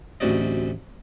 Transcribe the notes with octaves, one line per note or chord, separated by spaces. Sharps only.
A1 D2 C3 F#4 D5 D#5